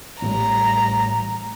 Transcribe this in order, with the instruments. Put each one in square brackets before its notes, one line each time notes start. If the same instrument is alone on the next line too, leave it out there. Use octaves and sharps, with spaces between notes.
[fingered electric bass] A1 A2 G3 [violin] A#5